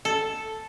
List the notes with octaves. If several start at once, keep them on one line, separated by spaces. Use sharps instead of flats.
A4